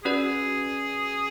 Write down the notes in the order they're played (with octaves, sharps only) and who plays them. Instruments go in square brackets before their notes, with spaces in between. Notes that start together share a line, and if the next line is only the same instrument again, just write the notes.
[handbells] C#4 F#4 B4 D5 [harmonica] G#4